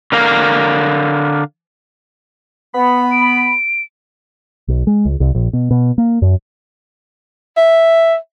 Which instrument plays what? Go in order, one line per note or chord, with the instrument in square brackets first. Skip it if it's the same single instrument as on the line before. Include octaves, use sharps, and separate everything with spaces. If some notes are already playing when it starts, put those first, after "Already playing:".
[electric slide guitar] D3 A#4 F5
[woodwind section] B3 B5 [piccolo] F#5
[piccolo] D7
[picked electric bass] B1
G#3
C#2
C2
A#1
B2
B2
A#3
F#2
[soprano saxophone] E5